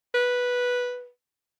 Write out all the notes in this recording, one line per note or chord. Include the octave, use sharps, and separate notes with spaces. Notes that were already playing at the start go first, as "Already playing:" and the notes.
B4